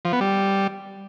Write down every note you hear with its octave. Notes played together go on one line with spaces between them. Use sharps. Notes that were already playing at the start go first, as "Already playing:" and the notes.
F3
B3
G3